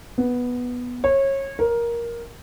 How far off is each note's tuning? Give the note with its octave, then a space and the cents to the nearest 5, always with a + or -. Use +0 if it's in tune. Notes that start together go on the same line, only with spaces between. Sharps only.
B3 -5
C#5 -25
A#4 +10